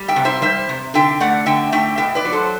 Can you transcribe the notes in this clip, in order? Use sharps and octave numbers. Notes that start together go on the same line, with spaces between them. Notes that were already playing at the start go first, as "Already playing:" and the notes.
Already playing: G3
E5 G5
C3
C5 E5
G3 C5 E5
C3
D3 E5 G5
A3 D5 F#5
D3 E5 G5
A3 E5 G5
B2 E5 G5
B4 D5
F#3
A4 C5